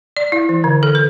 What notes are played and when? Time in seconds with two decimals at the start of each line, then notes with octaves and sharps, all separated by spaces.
0.17 D5
0.32 E4
0.49 E3
0.64 D3
0.83 A4
0.95 B4